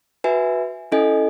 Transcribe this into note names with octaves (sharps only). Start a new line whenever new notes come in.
F#4 B4 E5 G#5
C#4 E4 A4 D#5 G#5